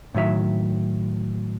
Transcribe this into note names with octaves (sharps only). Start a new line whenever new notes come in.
A2 D#3 F#3 E5